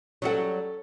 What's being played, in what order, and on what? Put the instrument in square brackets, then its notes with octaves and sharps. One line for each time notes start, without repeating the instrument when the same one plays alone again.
[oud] F#3 G3 F#4 [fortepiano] C#4 A4